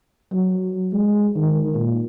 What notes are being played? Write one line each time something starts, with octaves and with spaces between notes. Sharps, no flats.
F#3
G#3
D#3
A#2